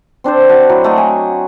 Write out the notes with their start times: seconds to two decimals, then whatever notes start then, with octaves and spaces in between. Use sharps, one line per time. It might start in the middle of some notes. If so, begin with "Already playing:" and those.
0.24 C4 D4 A4 C5
0.49 F#4 F#5 A5
0.69 F#3 E4
0.84 A3 D#5
0.97 G#5